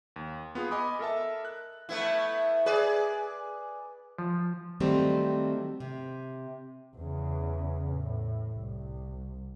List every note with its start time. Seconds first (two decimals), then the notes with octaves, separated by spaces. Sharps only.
0.16 D#2
0.55 B3 F4 G#4
0.71 D#5 G#5 B5 D6 D#6
0.99 A4 A#4 E5 A5
1.45 F#6
1.89 A3 B3 E4
2.66 G#4 B4 D5
4.18 F3
4.80 D#3 F#3 G3 A3 C4
5.80 C3
6.97 E2 C#3
7.95 A2
8.53 C2